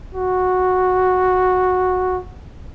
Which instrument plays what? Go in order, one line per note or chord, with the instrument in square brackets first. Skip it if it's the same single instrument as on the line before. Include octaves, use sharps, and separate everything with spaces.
[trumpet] F#4